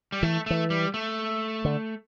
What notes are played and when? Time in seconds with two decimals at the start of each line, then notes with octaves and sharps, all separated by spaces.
0.12 G3
0.23 E3 A3
0.46 E3 A3
0.70 G3
0.94 A3
1.65 D3